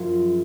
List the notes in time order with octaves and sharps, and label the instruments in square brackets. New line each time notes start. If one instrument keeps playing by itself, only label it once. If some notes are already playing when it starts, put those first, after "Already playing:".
Already playing: [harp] F#2 F3 F4 G#4 A#4